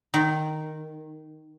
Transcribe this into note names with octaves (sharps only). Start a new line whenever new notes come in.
D#3